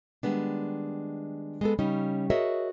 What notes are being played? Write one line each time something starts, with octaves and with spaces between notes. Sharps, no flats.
D#3 G3 G#3 B3 D4
G#3 B3 A4
C#3 G3 C#4 D#4
F#4 G#4 A#4 C#5 D#5 E5